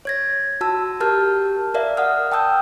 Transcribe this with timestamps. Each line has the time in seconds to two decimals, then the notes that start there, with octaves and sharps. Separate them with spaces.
0.05 C#5 G#6 A#6
0.61 F#4 A5 E6
1.00 G4 A#4 A5 F6 G6
1.74 A#4 D5 E5 F5
1.97 F#5 D#6 F6
2.32 G5 A5 D#6 E6 G6